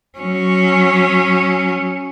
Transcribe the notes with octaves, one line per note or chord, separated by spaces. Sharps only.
F#3 C#4